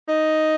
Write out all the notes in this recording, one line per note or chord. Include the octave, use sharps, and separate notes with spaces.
D#4